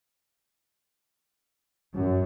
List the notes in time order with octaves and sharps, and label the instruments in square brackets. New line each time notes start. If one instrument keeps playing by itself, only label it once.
[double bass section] F#2